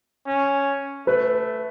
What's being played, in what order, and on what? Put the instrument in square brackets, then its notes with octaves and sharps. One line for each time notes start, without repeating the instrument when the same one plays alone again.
[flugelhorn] C#4
[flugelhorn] A3 [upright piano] B4